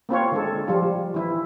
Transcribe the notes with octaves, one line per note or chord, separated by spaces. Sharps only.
A#3 C4 F4 C#5
D3 G#3 A4
F3 G3 F4
E3 E4